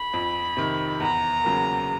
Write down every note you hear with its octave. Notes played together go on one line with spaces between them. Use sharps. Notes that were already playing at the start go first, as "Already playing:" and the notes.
Already playing: B5
F2
C3 D#3
E2 A#5
C#3 F#3 A#3